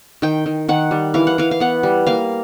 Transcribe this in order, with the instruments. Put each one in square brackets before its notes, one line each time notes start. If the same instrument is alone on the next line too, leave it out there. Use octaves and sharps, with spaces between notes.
[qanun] D#3 G5
D#3
D#3 F#5
G3
E3 F5
F#5
E3 F5
F5
B3 F#5
G3
A#3 F5